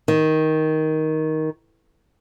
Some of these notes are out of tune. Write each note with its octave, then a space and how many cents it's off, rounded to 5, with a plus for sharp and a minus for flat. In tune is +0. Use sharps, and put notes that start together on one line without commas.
D#3 +10